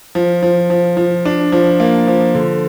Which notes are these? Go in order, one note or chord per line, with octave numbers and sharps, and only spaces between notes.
F3
F3
F3
F3
D4
F3
A#3
F3
D3